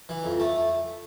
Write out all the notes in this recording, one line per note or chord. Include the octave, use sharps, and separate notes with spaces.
E3
F2
A3